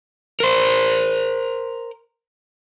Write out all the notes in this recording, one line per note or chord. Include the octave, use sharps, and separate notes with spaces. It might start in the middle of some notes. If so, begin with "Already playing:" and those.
A#4 C5